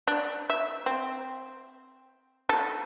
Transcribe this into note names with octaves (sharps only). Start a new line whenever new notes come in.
D4
E5
C4
A4